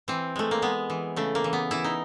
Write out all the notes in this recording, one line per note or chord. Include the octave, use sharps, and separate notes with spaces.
E3 C4
G#3 A3
A#3
G#3 B3
E3
C#3 A3
A#3
E3
B3
E3 E4
D#4